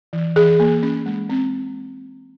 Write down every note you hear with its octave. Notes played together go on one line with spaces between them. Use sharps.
E3
E3 G#4
A#3
C#4
G#3
C4